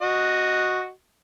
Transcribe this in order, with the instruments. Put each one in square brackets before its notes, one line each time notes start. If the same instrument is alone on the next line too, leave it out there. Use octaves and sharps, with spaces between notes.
[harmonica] F#4 D#5